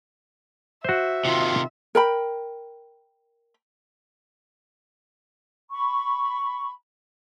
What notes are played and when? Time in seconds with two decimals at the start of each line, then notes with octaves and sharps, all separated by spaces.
0.84 F#4 C5 E5
1.25 C3 D#3 F4
1.95 A#4 G5 B5
5.70 B5 C#6